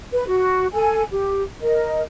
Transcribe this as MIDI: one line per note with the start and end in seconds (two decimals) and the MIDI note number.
0.13 0.24 71
0.27 0.66 66
0.73 1.03 69
0.73 1.03 80
1.12 1.42 67
1.61 2.01 70
1.61 2.01 75